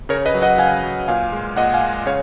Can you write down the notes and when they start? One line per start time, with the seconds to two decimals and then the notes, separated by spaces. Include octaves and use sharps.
0.09 C#3 A#4 C#5
0.26 B4 D#5
0.34 F#3
0.42 D#5 F#5
0.58 C#3 F5 G#5
0.83 F#3
1.08 A#2 F5 G#5
1.32 G#3
1.56 A#2 D#5 F#5
1.74 F5 G#5
1.81 G#3
2.06 C#3 C#5 F5